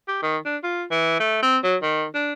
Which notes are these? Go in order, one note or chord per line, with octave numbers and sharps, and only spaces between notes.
G4
D#3
D4
F4
E3
A3
C4
F#3
D#3
D4